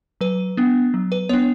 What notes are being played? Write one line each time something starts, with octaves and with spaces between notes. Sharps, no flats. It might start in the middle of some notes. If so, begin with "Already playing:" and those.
F#3 B4
B3 D4
F#3
B4
B3 D4 C#5